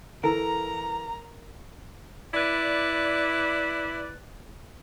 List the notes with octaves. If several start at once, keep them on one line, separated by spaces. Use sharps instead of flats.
E3 A4 A#4 A#5
E4 B4 D5